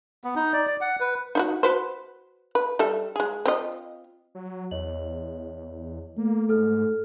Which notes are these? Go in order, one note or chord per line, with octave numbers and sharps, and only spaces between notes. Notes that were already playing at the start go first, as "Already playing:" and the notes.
B3
D#4
D5
D5
F#5
B4
D#4 E4 F#4
F#4 B4 C5
B4
G3 A4 E5
G#3 G#4
C4 F4 D#5
F#3
E2 C#5 D#5 F#7
A3 A#3
G#2 A4 F6